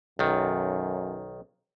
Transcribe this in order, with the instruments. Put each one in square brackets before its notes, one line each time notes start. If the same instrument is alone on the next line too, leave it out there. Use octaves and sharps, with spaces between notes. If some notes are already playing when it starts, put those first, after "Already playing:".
[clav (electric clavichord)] B1 D#3 [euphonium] F#2